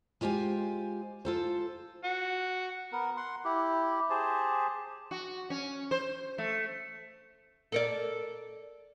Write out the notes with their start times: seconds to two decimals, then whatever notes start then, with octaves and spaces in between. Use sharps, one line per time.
0.21 G#3 F4 G4 C5 G#5
1.25 F4 A4 C5
2.04 F#4
2.92 B3 A#4
3.17 F#5 C6
3.44 E4 G4
4.10 G4 G#4 C5 A5
5.11 F#4
5.50 C#4
5.91 C5
6.38 A3
7.72 A4 A#4 D5